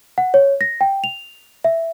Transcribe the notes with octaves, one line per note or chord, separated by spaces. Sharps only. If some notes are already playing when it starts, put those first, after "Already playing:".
F#5
C#5
A#6
G5
F7
E5